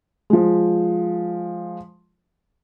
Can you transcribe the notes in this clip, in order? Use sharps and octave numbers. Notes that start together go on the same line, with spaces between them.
F3 G#3